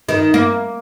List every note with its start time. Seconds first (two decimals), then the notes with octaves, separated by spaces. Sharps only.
0.09 D#3
0.34 A#3